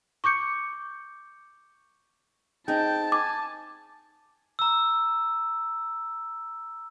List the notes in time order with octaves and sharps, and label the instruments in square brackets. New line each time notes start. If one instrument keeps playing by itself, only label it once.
[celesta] C#6 D6 G6 C#7
[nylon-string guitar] C4 D#4 G#4 [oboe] G5 [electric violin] A5
[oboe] G#5 [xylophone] D6
[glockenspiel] A#5 E6